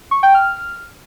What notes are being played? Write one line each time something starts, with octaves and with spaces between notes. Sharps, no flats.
C#6
G5
F6